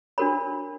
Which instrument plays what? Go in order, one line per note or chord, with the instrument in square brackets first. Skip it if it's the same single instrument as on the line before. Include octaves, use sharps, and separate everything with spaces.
[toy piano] D4 F#4 A#4 C#5 B5